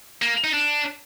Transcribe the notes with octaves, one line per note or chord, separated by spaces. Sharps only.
A#3
D#4
D4